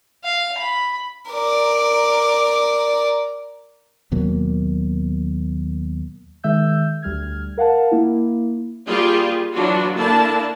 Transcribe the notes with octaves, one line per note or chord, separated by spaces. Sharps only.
F5
B5
A#4 D5
D#2 B2 F#3 A#3
D#3 G#3 E5 E6 G6
D2 G3 F6 G#6
A#4 F5 F#5 A5
A#3 E4
G3 A#3 F4 G4 G#4
E3 F#3 D4 F4 F#4
D3 A#3 D4 E4 A5